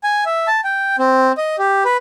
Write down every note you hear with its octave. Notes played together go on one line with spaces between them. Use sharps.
G#5
E5
A5
G5
C4
D#5
G4
B4